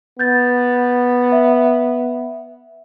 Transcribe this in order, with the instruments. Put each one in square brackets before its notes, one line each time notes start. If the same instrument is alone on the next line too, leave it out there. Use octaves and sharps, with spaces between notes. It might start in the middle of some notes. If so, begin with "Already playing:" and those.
[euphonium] B3 [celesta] G6 A6
[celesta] E5